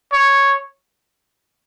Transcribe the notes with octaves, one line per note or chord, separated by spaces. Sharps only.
C#5